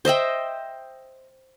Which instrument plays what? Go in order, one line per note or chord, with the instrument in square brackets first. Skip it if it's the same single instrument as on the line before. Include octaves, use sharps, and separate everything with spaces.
[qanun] C5 D#5 E5 G5